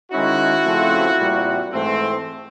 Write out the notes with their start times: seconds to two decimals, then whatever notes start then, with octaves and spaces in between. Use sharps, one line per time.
0.12 D#3 G#3 C#4 E4 F#4
0.66 C#3 F3 A3 C4
1.19 A#2 G3 C4
1.72 G#2 E3 A3 C4